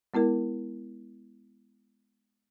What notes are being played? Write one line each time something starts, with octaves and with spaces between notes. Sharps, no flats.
G#3 B3 E4 A#4